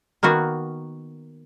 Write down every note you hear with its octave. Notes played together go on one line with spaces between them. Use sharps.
D#3 A#3 B3 F#4